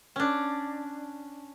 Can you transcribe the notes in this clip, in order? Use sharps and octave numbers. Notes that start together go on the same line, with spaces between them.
C#4 D4